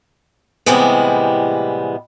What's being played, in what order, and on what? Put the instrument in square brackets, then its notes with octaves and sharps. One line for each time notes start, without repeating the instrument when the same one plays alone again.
[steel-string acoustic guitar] A2 C3 E3 G3 G#3 B3